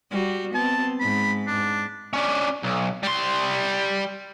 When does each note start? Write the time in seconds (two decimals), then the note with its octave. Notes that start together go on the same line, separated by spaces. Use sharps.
0.11 G3 F#4
0.55 B3 C4 A5
1.00 G#2 B5
1.47 D4
2.13 C#4 D4
2.63 B1
3.03 G3 C6